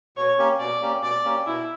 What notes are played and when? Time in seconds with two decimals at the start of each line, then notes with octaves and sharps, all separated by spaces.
0.17 B2 C#5
0.38 A#3 C#4 G4
0.60 B2 D5
0.82 A#3 C#4 G4
1.02 B2 D5
1.24 A#3 C#4 G4
1.46 B2 E4